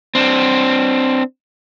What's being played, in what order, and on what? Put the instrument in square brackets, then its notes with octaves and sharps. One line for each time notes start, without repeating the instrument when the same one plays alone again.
[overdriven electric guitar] C4 D4